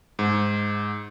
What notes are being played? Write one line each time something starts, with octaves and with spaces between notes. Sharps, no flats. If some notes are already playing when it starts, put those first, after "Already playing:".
G#2